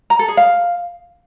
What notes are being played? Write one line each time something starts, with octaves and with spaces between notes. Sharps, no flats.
A#5
A4
G#4
F5